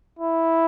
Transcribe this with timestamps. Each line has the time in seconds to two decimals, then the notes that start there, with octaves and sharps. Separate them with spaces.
0.20 E4